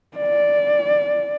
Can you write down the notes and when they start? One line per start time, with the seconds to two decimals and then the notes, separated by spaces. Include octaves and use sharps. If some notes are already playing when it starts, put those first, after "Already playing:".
0.17 D5